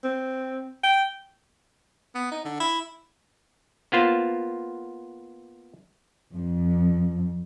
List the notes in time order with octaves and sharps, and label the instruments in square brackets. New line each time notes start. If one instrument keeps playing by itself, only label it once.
[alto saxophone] C4
G5
[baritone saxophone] B3
D#4
D3
E4
[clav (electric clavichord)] A#3 B3 F4 C5
[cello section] F2